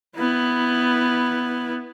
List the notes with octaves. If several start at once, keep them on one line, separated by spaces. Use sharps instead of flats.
B3 E4